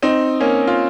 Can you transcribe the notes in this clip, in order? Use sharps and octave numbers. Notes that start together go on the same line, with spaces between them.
C4 D#4
A#3 C#4
F4